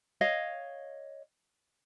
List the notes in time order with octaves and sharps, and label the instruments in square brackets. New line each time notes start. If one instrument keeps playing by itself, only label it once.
[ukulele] C#5 D#5 F5